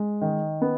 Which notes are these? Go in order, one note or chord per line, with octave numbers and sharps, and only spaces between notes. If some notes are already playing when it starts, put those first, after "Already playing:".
Already playing: G#3
D#3
B3